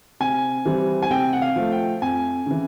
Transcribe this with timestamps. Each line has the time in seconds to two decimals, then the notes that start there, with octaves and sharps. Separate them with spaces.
0.20 C3 G#5
0.65 E3 G3 C4
1.03 G#5
1.10 C3 G5
1.33 F#5
1.42 F5
1.56 F3 A3
1.72 G5
2.02 F2 G#5
2.46 C#3 E3